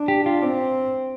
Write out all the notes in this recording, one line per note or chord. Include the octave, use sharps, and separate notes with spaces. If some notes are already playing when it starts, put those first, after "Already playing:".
Already playing: D4
G4
F4
C4